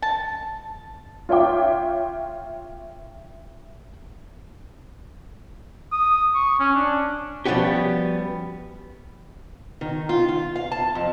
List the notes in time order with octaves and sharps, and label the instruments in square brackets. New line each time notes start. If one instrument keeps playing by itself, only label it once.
[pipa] A5
[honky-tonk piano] F4 C#5 E5 G5 D6
[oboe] D#6
C#6
C#4
D4
[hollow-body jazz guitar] F3 G3 B3 C#4 F#4 G4
[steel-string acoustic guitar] D#3
F4
F4
F5
A5
F2